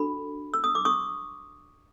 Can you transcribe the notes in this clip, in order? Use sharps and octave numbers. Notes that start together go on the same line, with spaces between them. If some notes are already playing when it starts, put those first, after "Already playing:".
Already playing: D4 F#4 A4 B5
E6
D#6
D6
C#6 D#6